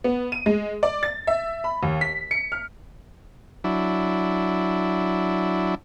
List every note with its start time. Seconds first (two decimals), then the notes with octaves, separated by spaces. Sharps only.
0.04 B3
0.32 D#7
0.46 G#3
0.83 D5
1.03 A6
1.27 E5
1.64 B5
1.83 D#2
2.01 B6
2.31 C#7
2.52 F6
3.64 F#3 D4 E4